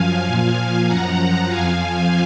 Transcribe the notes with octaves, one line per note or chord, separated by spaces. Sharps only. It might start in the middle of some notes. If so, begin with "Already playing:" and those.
Already playing: F#2 F3 F5 G#5
A#2 F3
F#2 F3 F#5 A#5
F#5 A#5
F2 F3 F5 G#5